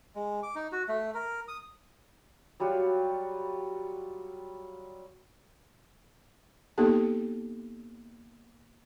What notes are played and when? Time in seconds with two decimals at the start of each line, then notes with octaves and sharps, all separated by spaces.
0.15 G#3
0.43 D6
0.55 D#4
0.72 F#4
0.88 A3
1.14 A#4
1.48 D#6
2.60 F#3 G3 F4 F#4
6.78 A#3 B3 D#4 G4 A4 A5